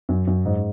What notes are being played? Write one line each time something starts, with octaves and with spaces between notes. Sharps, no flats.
F#2
F#2
G#2